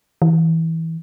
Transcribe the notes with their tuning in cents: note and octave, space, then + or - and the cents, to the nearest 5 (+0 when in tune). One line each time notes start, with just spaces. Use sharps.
E3 -20